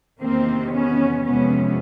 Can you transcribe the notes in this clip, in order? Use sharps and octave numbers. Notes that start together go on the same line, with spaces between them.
E2 C3 D#3 A#3 C4
B3 C#4
F2 C3 F3 G#3 B3 C#4